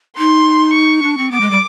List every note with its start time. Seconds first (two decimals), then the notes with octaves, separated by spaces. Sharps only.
0.18 D#4 C6
0.74 C#6
1.03 D4
1.18 C4
1.31 B3 D6
1.41 G#3
1.51 G3